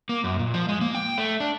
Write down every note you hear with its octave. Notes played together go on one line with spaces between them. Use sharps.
A#3
F#2
A#2
F3
G#3
A#3
G5
A3
D4